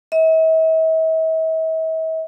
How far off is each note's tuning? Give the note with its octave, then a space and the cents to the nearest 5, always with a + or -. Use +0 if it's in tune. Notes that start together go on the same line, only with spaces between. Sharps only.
E5 -45